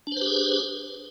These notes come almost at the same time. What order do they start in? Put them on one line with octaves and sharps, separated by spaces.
D4 C5 B4 G4 G#4